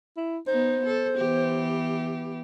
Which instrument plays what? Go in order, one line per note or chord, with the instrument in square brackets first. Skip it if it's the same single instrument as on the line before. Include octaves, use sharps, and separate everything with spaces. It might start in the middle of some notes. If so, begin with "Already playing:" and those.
[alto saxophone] E4
[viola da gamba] B3 D#4 [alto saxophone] C5
[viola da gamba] A4
E3 B3 G4